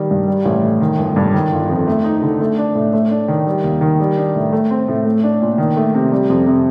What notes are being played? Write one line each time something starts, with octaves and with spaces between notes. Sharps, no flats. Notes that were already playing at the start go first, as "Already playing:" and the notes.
Already playing: D#3 G3
G2
G3
A1
A2
D#3
G1
G2
D#3
G1
F2
A3
D#4
D3
A3
D4
A2
A3
D4
D#3
G3
D#2
D#3
G3
D4
A2
A3
C4
A2
A3
D4
A#2
D#3
A3
C3
G3
F2
C3